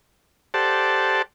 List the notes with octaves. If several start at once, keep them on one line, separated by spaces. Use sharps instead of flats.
G4 A4 C5 D5 F#5 A5